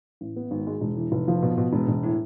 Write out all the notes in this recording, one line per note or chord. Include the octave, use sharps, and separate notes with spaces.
A1
B3
G#1
G#3
E1
E3
F1
F3
B2
B2
E1
E1
A2